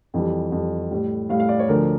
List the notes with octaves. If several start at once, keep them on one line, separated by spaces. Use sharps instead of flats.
F2 E3 G3
F2 E3 G3
A2 G3
A2 G3 F5
F5
D5
C#5
D2 D3 F3 A#4